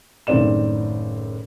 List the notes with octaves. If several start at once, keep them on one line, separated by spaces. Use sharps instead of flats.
F#1 A2 D#3 C4 D5 E7